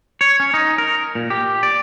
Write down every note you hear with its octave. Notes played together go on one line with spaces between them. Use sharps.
C#5
C#4
D#4
A#4
A#2
G4
D5